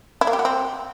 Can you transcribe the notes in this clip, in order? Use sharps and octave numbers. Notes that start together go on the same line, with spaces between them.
E4
A#3
G4
F#4
C4